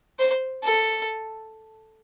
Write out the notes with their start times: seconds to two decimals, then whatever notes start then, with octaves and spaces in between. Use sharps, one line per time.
0.19 C5
0.64 A4